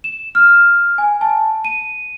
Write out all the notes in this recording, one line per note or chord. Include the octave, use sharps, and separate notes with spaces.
E7
F6
G#5
A5
D#7